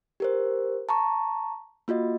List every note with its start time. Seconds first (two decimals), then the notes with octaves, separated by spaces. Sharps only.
0.20 G4 A#4 C5
0.89 A5 A#5 C#6
1.88 A#3 F4 F#4 D#5